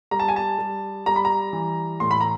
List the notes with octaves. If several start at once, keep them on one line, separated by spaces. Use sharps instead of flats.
G3 A#5
A5
G#5
A5
G3
G3 A#5
B5
A#5
E3
A2 C6
B5
A#5